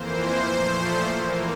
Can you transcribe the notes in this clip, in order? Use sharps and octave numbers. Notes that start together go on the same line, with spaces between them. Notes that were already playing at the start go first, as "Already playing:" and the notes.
Already playing: F2 E3 A#3 C5
A#2 F3 A3
E2 E3 A#3